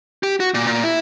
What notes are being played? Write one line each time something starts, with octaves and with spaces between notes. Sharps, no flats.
G4
F#4
A#2
A#2
E4